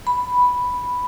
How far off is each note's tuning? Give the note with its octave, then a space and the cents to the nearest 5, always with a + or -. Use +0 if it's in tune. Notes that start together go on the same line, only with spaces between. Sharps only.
B5 +0